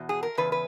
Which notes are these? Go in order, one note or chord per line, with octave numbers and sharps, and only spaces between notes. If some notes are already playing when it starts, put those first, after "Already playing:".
Already playing: E2 B2
G#4
A#4
E2 C#3 B4
B4